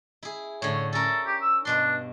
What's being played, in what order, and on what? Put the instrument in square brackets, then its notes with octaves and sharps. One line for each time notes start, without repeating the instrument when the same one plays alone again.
[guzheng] E4 G#4
[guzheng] A2 D3 [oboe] C#5
[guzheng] C#4 A#4 [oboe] A4
[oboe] G4
E6
[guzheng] G2 B2 C6 [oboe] D4